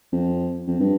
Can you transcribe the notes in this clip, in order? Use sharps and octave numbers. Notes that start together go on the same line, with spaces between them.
F2
F2
G2